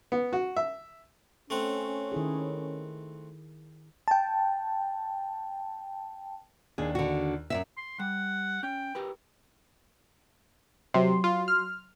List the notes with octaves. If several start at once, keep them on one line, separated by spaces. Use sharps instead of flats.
B3
F#4
E5
A3 C4 C#4 F#5
D#3 E4 G#4
G5 A5
D#2 D4 G#4
D3 F#4
F#2 B2 E5
C6
G3 F#5
C#4 G5
G4 A#4 B4
C3 F#3 C6
F4
F6